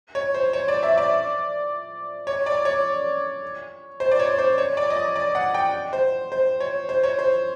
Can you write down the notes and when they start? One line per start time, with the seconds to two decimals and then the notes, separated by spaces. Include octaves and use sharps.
0.15 C#5
0.34 C5
0.53 C#5
0.68 D5
0.83 E5
0.97 D5
2.27 C#5
2.46 D5
2.65 C#5
4.00 C5
4.11 D5
4.19 C#5
4.38 C5
4.58 C#5
4.77 D5
4.90 D#5
4.97 D5
5.16 D5
5.35 F#5
5.54 G5
5.93 C5
6.32 C5
6.60 C#5
6.89 C5
7.03 C#5
7.19 C5